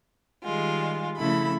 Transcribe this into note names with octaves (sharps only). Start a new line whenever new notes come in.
D#3 G3 G#3 F4
C#3 F3 A3 E4 A4 B5